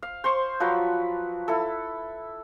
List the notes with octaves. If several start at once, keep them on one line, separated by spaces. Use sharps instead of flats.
F5
C5 C6 C#6
F3 F#3 B4
E4 A4